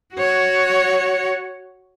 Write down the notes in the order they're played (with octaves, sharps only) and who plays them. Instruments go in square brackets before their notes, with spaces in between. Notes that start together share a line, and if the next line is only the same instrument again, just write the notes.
[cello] F#4 C#5